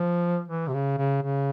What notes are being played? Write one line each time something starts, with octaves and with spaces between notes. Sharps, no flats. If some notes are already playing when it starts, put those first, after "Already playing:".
Already playing: F3
E3
C3
C#3
C#3
C#3